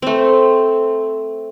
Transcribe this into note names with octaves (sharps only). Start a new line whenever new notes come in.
A3 C4